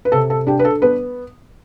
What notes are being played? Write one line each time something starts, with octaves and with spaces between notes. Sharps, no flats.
B4
C3 A4
A4
D4 G4
B4
A4
B3 B4